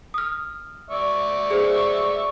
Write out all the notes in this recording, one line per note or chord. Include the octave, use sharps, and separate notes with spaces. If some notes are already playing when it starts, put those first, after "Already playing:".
D#6 F6
D5 E5 C#6
G#4 C5